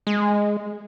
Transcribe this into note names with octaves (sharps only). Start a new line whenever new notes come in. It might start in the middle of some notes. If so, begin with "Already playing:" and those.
G#3